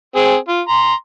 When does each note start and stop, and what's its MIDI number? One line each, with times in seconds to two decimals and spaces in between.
0.16 0.35 60
0.16 0.35 68
0.48 0.61 65
0.68 0.94 82
0.68 0.94 84